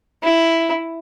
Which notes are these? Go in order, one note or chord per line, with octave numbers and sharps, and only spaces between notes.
E4